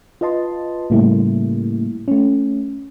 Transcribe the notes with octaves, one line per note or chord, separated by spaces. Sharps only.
F4 B4 D#5 A5 C6
A2 C#3 G3 A3 A#3 E4
A3 C#4